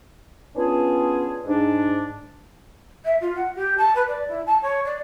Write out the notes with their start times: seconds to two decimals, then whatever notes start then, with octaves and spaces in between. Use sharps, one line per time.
0.56 B3 C#4 D4 F4 G#4 A5
1.45 G#2 D4
3.05 E5
3.21 F4
3.35 F#5
3.56 G4
3.78 A5
3.95 B4
4.08 D5
4.28 E4
4.46 A5
4.62 C#5
4.85 D5